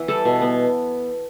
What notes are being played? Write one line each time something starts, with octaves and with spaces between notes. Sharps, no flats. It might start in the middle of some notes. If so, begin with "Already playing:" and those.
Already playing: E3 B3
G3 A4
B2
B3